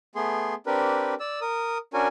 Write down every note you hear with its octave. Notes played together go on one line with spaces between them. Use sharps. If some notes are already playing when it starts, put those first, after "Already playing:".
A3 B3 G#4 C6
C4 D4 G4 A#4 B4
D5 E6
A#4 D#6
C#4 D4 F#4 A#4 G#5